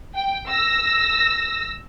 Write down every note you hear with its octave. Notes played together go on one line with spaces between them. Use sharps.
G5
E6 A#6